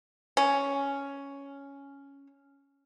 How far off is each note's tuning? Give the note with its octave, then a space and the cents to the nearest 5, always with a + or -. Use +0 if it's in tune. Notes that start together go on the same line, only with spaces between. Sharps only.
C#4 +5